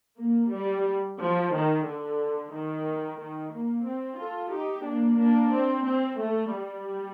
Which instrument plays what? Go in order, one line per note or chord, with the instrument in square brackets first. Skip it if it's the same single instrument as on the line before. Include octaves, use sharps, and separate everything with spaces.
[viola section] A#3
G3
F3
D#3
D3
D#3
D#3
A#3
C4
F4 A4
D#4 G4
A#3 D4
A#3 D4
C4
C4
A3
G3